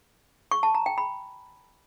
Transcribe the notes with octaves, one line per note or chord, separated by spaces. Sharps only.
C#6
A5
A#5
G5
B5